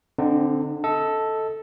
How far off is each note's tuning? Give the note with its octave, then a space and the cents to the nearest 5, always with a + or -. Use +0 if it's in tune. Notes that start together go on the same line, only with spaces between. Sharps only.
D3 +0 C4 +0 D#4 -40
A4 +0 D#5 +30